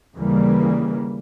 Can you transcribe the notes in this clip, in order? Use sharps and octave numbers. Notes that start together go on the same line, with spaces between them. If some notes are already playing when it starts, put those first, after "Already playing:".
D#2 C#3 E3 G3 A#3